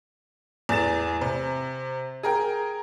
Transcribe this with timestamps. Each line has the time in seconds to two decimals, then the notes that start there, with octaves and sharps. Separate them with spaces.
0.69 E2 A2 A6 E7
1.21 C3
2.23 G#4 A#4 G5